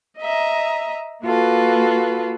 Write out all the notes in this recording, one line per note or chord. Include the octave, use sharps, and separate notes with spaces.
D#5 E5 A#5
A#3 F4 F#4 A4 B4